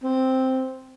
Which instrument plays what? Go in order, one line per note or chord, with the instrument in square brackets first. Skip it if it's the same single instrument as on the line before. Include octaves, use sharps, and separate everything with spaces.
[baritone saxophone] C4